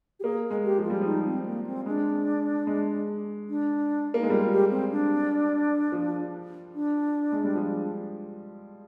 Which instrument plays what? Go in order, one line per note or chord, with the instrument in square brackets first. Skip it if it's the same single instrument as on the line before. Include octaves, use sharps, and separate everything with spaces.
[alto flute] G4
[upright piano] A#3 [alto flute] G#4
[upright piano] G#3
[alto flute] G4
[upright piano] F3
[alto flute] F4
[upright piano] G3
[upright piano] F3 [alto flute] D#4
[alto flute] C4
A#3
C4
[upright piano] G#3 [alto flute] D4
[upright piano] G#3
[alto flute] D4
[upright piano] A#3
[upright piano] G#3 [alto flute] D#4
[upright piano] G3 [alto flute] F4
[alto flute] G4
C4
D4
[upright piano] F3
[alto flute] D4
[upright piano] G#3
G3
F3